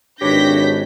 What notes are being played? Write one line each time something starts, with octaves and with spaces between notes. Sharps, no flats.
G#1 D4 G4 B4 C#5 G6 A#6 B6